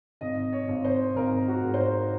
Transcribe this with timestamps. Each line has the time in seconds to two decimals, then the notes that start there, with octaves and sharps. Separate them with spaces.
0.21 G#1 D#5
0.53 C#5
0.69 G#1
0.85 C5
1.16 G#1 A#4
1.48 F#4
1.63 G#2
1.74 C5
1.79 A#4